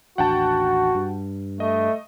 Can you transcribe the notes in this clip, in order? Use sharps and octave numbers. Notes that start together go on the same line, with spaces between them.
A1 D#2 D4 F#4 F#5 G5 A5
G2
A3 D#5